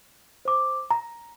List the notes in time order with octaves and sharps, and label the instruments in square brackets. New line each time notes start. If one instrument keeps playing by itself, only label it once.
[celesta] C5 D6
A#5